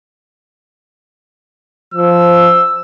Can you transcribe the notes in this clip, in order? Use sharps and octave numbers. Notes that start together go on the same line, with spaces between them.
F3 E6